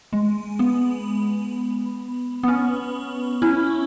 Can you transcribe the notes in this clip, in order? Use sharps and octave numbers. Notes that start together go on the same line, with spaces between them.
G#3
B3
B3
C#4
C#4 E4